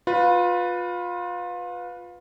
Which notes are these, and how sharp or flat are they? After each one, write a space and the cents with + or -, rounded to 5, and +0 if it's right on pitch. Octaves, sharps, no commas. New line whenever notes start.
F4 +25 B4 +0